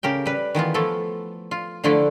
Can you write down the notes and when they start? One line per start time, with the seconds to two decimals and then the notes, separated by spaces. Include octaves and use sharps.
0.03 C#3 G4 A#4 G5
0.26 G3 B4
0.55 D#3 E3 B3 F4
0.74 F3 A3 B3 E4 A4
1.51 F4
1.84 D3 F3 A3 D4 E4 A4